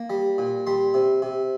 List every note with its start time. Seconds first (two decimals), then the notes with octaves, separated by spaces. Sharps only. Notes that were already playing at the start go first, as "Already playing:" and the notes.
Already playing: A#3
0.10 G3
0.38 A#2
0.67 G3 C6
0.94 C3
1.22 C3